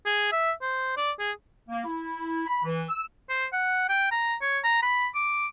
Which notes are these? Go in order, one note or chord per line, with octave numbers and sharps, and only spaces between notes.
G#4
E5
C5
D5
G#4
A#3
E4
B5
E3
E6
C5
F#5
G5
A#5
C#5
A#5
B5
D6